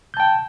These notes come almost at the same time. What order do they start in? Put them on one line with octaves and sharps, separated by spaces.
G6 A5 G5